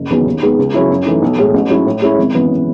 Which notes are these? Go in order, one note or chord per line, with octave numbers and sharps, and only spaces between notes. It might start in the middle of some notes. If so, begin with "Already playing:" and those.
Already playing: F#1
E2 D#3 F#3 B3
D#2
D#3 G#3 B3
C#2
C#3 F#3 C#4 E4
F#2
E3 A3 D#4
B1
A2 G#3
A1
G#2 F#3 C#4 E4
A2
G#3 C#4 E4
G#1
F#2 E3 B3